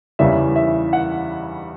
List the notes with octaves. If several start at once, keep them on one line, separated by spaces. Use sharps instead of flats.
E2 C#3 E3 G3 C#4 E5
E5
F#5